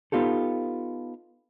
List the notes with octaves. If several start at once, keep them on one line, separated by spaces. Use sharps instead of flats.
B3 D#4 F4 G4 A4